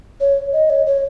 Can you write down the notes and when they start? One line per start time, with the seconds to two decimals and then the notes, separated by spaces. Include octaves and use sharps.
0.21 C#5
0.53 D#5
0.70 C#5
0.86 C#5